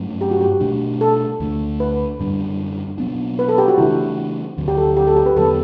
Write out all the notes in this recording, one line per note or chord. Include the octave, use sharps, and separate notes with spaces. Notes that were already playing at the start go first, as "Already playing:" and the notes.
Already playing: G2 F#3 A3 C#4
G4
F#4
G4
B2 A3 D4
A4
D2 D3 F#3 A3
B4
F#2 D3 G3 D4
B2 F#3 B3 D4
B4
A4
G4
F#4
C#3 E3 A3 D4 E4
D2 D3 F#3
G4
A4
G4
A4
G4
B4
E2 D3 F#3 B3 A4